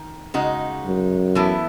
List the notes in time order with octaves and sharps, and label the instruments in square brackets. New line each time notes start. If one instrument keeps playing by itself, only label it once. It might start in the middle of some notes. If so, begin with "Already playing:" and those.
Already playing: [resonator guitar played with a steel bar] D#3
C#3 G#3 D#4 F#4
[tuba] F#2
[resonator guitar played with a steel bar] E3 B3 E4 A4